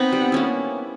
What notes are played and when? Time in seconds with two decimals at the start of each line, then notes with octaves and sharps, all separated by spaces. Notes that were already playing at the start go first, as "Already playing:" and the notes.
Already playing: B3 C4 D#4
0.12 G3
0.32 A#3 C#4 E4